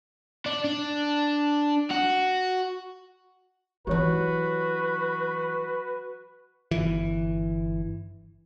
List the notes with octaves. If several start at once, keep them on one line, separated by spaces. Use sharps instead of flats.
D4
D4
F#4
E3 F#3 F#4 G4 B4 C#5
G1 E3